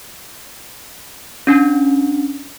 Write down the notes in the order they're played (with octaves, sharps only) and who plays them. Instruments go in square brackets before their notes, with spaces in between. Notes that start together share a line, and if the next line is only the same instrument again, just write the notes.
[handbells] C#4 D4